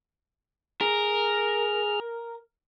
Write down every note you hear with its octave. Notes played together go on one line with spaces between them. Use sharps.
G#4 A#4 F6